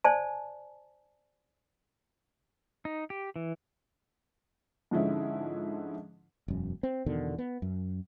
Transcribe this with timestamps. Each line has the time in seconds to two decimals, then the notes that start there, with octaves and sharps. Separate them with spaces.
0.05 C5 D5 G#5 A5
2.85 D#4
3.10 G4
3.36 E3
4.91 G#2 D3 F3 G#3 C#4 E4
6.48 E1 F#2
6.83 C4
7.06 E2 B2 D3 D#3
7.38 B3
7.62 F#2